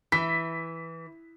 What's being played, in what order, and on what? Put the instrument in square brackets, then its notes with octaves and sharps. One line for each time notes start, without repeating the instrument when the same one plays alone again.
[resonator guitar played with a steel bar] E3 [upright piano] B6